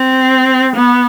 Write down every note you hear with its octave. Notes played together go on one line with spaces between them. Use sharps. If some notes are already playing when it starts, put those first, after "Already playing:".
Already playing: C4
B3